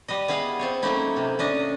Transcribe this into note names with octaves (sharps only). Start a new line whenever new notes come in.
G3 B4 D#5
B3 E4 G#4 F5
C4 F4 C#5
F#3 A3 A#3 C#4 D#4 E4
C3
C#4 D4 D#5